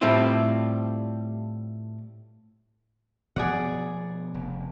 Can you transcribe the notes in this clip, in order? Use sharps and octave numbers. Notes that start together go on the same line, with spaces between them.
A2 G3 A3 C4 E4 F4
B2 F3 B3 G#4 D5 F#5
F1